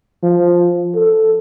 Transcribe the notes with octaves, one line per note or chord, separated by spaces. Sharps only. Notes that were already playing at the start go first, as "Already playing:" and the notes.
F3
A4